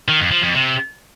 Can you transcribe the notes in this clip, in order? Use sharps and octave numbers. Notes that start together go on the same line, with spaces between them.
D#3
F2
F3
F2
C3